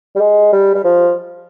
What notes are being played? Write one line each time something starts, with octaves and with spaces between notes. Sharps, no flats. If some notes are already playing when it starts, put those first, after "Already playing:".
G3
G#3
G3
G3
F3